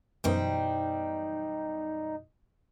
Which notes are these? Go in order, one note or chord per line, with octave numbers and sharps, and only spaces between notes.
F#2 B2 E3 G3 D#4 C5 G5